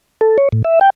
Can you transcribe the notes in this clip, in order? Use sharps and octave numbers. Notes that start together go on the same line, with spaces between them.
A4
C#5
A2
E5
G5